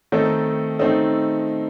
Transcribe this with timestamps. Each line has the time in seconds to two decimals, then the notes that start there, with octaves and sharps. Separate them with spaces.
0.12 D#3 A3 C4 D#4 A4
0.79 D#3 A3 C4 D#4 A4